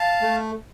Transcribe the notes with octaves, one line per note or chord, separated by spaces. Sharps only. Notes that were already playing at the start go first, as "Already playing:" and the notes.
Already playing: F5 A5
A3